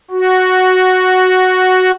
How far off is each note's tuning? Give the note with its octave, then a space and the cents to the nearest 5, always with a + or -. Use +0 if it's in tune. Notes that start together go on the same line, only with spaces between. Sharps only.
F#4 +0